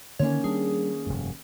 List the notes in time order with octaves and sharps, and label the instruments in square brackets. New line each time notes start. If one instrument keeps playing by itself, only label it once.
[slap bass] D3 [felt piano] D#3 A#3 C#4 [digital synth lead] C#5
[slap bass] G3 D4 [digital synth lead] G#4
[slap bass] F1 G2